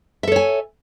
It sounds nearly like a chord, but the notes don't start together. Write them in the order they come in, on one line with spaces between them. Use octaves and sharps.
E5 A4 C#5 G#5